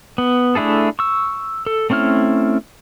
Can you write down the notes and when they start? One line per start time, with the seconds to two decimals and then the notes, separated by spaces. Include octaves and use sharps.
0.18 B3
0.55 A3 D4 E4 G#4 A4
0.99 C#6 E6
1.66 A4
1.90 A3 C4 C#4 E4 F6